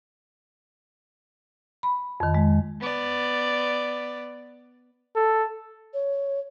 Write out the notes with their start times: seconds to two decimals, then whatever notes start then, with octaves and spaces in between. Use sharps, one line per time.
1.83 B5
2.20 F2 D#3
2.34 G#3
2.80 B3 D5
5.15 A4
5.94 C#5